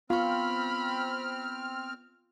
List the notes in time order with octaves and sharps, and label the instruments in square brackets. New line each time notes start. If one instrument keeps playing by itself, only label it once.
[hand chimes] B3 C#6 [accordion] C4 F6 [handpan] F4 [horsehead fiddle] B5